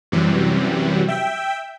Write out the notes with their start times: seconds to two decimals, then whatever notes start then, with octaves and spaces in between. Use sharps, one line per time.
0.12 F#2 C3 E3 F#3 G3
1.08 E5 G5